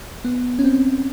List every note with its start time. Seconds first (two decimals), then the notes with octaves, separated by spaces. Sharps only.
0.25 B3
0.59 C#4
0.64 C4